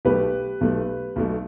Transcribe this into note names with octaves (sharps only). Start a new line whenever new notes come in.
B1 B2 A3 G4 B4
B1 B2 A3
B1 B2 A3